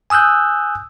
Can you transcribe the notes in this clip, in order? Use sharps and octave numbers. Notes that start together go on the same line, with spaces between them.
G#5 D#6 E6 F#6 G6